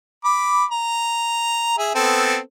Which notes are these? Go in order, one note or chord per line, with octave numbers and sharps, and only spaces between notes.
B5 D6
A#5
G#4 E5
B3 C4 A4